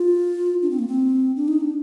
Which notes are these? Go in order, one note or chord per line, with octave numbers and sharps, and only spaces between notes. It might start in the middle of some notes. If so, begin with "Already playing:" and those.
Already playing: F4
D4
C4
A#3
C4
D4
D#4
D4